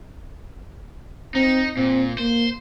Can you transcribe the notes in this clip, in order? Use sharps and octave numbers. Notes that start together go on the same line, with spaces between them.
C4 D#4
A#2 C4
A#3 C5